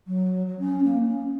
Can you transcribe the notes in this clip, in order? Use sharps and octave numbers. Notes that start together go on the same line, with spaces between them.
F#3
F#3
C#4
A#3
C#4